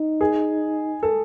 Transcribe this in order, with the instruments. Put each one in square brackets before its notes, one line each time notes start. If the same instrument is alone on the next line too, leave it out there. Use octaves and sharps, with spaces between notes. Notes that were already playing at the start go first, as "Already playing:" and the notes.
Already playing: [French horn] D#4
[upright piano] G#4
A4